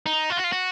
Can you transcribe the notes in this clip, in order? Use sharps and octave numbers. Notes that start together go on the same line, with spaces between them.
D#4
F4
F#4
F4
F#4